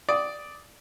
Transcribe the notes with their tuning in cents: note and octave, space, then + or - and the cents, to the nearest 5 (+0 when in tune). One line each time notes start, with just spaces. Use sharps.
D5 +0 D#6 +15